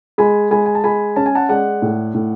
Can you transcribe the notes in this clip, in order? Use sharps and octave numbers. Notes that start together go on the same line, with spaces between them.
G#3 G#5 B5
G#3 G#5 B5
G#5
A5
G#3 G#5 B5
C#4 A5
G#5
F#5 A5
G#3 D5 F#5
A2
A2